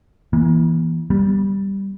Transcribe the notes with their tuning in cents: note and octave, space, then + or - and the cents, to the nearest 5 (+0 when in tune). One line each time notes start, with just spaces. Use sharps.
E3 +0 A#3 +40
G3 +0 B3 -30